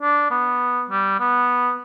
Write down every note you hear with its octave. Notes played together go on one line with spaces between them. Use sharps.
D4
B3
G3
B3